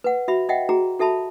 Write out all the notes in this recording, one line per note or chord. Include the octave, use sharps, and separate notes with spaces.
B4 F#5
F#4 E5 B5
D#5 E5 F#5 G5
F#4 G#4 A#5
F#4 A4 E5 A5 B5